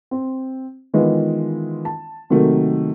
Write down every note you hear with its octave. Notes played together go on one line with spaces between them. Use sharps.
C4
D#3 E3 G#3 B3 E4 F4
A5
C3 D#3 F#3 A3 A#3